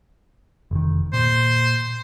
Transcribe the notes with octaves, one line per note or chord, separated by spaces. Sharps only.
F1 D#3
A#2 C5